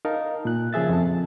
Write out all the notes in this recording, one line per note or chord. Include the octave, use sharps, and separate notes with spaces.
D#4 A#4 F5 A5
A#2 F#6
C#3 F3 G#4 E5 A6
F2 A4 A5